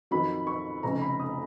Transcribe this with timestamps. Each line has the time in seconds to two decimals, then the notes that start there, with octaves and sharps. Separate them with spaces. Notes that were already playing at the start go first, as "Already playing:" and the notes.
0.11 F2 D#3 F#3 B5
0.47 C#6
0.83 F1 F2 C#3 A#5
1.01 B5
1.19 D#6